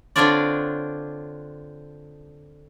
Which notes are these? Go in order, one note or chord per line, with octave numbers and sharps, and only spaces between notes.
D3 C4 D4 F4 C#5 D5